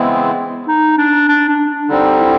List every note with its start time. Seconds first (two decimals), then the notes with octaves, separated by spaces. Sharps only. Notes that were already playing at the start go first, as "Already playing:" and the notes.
Already playing: C#3 E3 G#3 B3 C4 E4
0.68 D#4
0.98 D4
1.28 D4
1.49 D4
1.69 D4
1.89 D3 G3 C4 D#4
2.19 E4